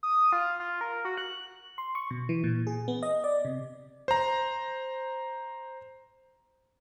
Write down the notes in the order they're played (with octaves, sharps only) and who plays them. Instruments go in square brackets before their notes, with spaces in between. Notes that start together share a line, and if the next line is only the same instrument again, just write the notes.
[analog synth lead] D#6
F4
F4
A#4
F#4
F#6
[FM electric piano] C6
C#6
B2
E3
A#2
G#4
B3
D#5
D5
C3
[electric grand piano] C5 A#5